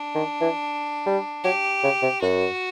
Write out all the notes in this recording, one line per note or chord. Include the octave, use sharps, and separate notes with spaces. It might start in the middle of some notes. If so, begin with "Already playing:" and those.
Already playing: D4
D#3
E3
G3
F#3 G4
C#3
C3
F#2 F#4